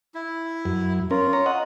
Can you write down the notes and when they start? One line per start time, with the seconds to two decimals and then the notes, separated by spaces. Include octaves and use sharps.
0.15 E4
0.65 F#2
1.11 C#4 F4 A#4
1.33 C#5 A#5
1.46 D#5 F#5